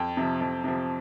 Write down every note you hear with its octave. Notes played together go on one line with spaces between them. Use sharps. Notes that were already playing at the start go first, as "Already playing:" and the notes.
Already playing: F2 G5
C3 F3
F2
C3 F3